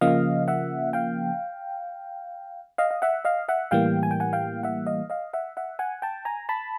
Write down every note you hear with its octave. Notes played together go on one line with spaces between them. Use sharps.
C#3 F3 A#3 D#5 F5
E5 F#5
F5 G5
D#5 F5
F5
E5 F#5
D#5 F5
E5 F#5
A2 E3 G3 A#3 F5 G5
G#5
G5
F#5 G#5
F5 G5
E5 F#5
D#5 F5
D#5 F5
E5 F#5
E5 F#5
F#5 G#5
G5 A5
G#5 A#5
A5 B5